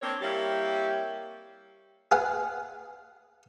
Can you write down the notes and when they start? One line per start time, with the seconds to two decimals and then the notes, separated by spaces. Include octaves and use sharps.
0.02 A#3 C4 D4 C#5
0.21 G3 A#3 C4 E4 G4 C#5
2.11 G#4 B4 F5 F#5 G#5